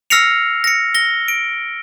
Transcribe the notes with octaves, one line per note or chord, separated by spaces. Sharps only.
E6 F6 A#6 C7 C#7 F7
A#6 C#7
A#6 G7
D7